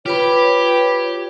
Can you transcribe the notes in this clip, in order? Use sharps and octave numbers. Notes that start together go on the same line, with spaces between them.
F4 G4 B4 C#5 B5